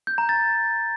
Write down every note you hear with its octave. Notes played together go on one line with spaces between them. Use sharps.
G6
A#5
A6